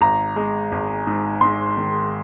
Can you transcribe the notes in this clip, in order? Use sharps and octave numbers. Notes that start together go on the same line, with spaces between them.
G#1 A#5
G#3
G#1
G#2
G#2 C6
D#3